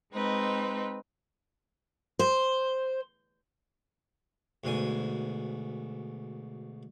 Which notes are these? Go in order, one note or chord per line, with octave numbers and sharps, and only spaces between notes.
G#3 C4 D#4 B4
C5
D2 G#2 B2 G#5